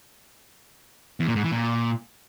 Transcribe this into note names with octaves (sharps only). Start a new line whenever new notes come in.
E2
A#2
G#2
E3
A#2